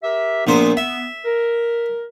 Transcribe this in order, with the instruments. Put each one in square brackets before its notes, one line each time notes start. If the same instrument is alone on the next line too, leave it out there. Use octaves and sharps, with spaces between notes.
[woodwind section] G4 A#4 E5
[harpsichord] A#1 A#2 C5 [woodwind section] B3
[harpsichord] E5
[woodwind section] A#4